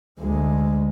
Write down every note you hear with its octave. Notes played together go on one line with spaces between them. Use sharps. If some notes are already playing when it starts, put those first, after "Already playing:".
D2 G#3